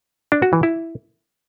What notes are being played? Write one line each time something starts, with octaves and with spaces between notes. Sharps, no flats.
D4
F#4
E3
E4